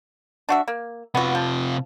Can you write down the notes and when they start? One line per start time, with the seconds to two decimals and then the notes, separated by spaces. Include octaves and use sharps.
0.49 D4 F#4 E5
0.68 A#3
1.15 C3 B3 F4 F#4
1.35 F3